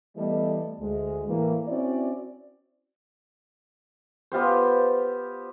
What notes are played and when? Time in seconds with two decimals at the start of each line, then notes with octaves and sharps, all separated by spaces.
0.16 E3 G3 A3 B3 A4 D#5
0.80 D2 G#3
1.28 A2 E3 A#3
1.67 C4 C#4 E4 F#4 D5
4.32 B3 F4 G4 C5